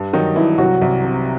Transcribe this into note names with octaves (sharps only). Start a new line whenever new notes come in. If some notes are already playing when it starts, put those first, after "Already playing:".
Already playing: G2
D#3 F#3 D#4
G2 E3 E4
C2 F#3 F#4
C2
C3